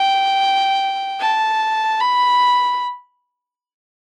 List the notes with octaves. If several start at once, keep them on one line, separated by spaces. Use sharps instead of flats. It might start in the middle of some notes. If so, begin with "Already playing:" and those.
Already playing: G5
A5
B5